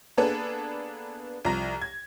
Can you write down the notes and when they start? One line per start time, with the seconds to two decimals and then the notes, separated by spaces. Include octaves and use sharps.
0.17 A#3 B3 D4 G#4 A4 B4
1.45 C2 F3 A#5 A#6
1.82 G#6